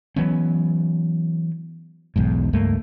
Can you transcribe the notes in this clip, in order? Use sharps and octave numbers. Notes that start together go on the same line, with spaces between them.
E3 F#3 B3 C#4
B1 E2 G#2
C#2 G2 A3 A#3